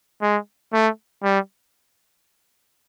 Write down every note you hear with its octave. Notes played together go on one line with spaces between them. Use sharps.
G#3
A3
G3